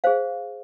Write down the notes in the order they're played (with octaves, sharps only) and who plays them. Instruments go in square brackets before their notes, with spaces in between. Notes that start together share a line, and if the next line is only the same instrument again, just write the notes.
[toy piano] G#4 C5 F5